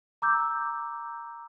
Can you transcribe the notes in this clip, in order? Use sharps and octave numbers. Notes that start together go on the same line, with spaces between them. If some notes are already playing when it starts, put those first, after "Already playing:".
A#5 D6 E6 G6